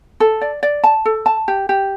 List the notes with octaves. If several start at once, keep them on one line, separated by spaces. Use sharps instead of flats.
A4
D5
D5
A5
A4
A5
G4
G4